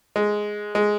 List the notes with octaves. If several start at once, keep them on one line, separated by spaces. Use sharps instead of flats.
G#3
G#3